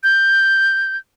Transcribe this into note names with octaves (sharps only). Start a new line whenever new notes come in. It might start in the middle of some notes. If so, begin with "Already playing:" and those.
G6